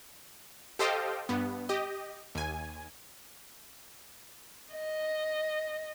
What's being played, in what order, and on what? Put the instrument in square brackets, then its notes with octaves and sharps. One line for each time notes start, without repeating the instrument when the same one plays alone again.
[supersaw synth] G4 A4 C5 D#5 F5 G5
G2 B3
G4 D#5
D#2 G#5
[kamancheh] D#5